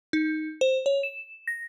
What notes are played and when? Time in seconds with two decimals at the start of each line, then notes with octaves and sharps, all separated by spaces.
0.13 D#4
0.61 C5
0.86 C#5
1.03 E7
1.47 A#6